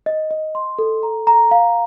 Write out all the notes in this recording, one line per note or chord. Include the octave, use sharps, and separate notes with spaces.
D#5
D#5
C6
A4
A#5
A#5
F5